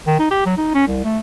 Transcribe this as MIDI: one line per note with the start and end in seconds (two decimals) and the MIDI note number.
0.07 0.15 51
0.19 0.27 63
0.31 0.43 67
0.46 0.56 54
0.58 0.74 63
0.74 0.87 61
0.87 1.02 36
1.04 1.19 57